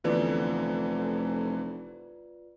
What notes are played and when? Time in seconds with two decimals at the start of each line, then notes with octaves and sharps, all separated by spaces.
0.04 F1 D3 E3 B3 F4 B4 D5